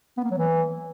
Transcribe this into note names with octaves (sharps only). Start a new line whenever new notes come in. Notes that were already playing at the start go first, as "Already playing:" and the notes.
B3
A#3
F#3
E3